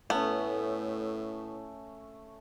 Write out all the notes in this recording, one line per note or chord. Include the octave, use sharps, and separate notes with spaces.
A2 A3 B3 C#4